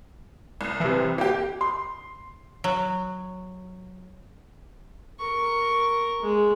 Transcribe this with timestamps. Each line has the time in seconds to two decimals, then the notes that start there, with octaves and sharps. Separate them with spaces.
0.61 C2
0.80 C3 E3
1.18 A#3 G4
1.61 C6
2.64 F#3
5.19 A#4 C#6
6.22 G#3